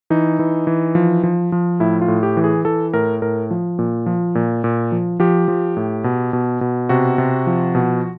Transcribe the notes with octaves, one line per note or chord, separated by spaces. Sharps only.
E3 D#4
E3
E3
F3
F3
F3
A2 E4
F4
A2
G4
E3
G#4
E3 A4
A2 A#4
A2 A#4
F3
A#2
F3
A#2
A#2
F3
F3 G4
F3
A2
B2
B2
B2
C3 F#4
C3
F3
B2